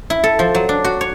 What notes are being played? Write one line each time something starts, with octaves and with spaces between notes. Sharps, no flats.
E4
A4
F3
F#3
D4
F#4
C#5